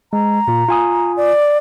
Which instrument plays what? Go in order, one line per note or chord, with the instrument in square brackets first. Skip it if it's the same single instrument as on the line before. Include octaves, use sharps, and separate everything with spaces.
[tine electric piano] G#3 [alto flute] A#5
[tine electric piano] A#2 F4
F4 G#5 D#6
[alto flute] D5